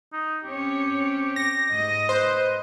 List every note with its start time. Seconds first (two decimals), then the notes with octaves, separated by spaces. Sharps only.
0.13 D#4
0.44 C4 C#4 G4 C#5
1.36 A#6
1.70 G#2 D#5
2.09 B4 C5